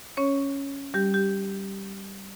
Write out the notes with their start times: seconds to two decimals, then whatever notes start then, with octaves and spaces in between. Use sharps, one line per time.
0.17 C#4 C#5
0.94 G3 G4
1.14 G4